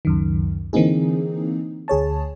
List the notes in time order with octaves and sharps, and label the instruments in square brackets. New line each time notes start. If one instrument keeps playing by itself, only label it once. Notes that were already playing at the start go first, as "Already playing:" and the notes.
[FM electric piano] C#2 F#2 D#3
D3 E3 A#3 C4 D#4 G#4
D2 G#4 C#5 A5